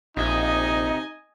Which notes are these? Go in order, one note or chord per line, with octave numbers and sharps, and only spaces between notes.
A#1 C4 D#4 G4 D#5 E5 G#5